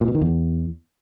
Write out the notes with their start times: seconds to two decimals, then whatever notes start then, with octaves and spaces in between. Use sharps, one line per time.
0.01 A#2
0.08 B2
0.15 D#3
0.21 E2